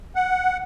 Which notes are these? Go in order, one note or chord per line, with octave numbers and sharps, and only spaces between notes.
F#5